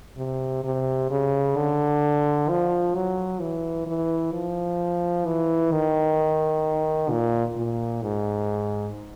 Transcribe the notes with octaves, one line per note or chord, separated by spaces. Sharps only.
C3
C3
C#3
D3
F3
F#3
E3
E3
F3
E3
D#3
A#2
A#2
G#2